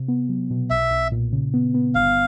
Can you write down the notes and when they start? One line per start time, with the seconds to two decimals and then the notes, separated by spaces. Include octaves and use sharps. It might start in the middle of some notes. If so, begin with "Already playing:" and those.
Already playing: C3
0.08 B3
0.29 F#3
0.50 B2
0.70 B1 E5
0.91 B1
1.12 A#2
1.32 C#3
1.54 B3
1.74 B3
1.95 G1 F5